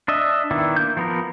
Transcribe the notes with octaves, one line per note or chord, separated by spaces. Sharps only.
D4 D#5 E5
D#3 B3 D4 E4
A#3 G6
F3 B3 A#4